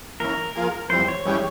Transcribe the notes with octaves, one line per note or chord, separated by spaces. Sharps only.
E3 A#3 C#4 A#4
F3 A#3 F4 G#4
F2 E3 G3 C4 C5
C#5
G2 E3 G#3 C#4 G4